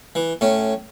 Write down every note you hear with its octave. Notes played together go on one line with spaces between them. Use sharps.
E3
A2 C#4